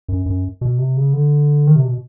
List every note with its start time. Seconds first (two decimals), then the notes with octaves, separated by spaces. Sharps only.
0.08 F#2
0.26 F#2
0.61 B2
0.78 C3
0.97 C#3
1.14 D3
1.67 D#3
1.76 C3
1.85 B2